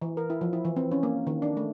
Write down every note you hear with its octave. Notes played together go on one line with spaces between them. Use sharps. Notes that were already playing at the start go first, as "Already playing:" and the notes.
E3
A#4
E4
F3
E4
E3
C4
C#4
A#3
D#3
D4
A3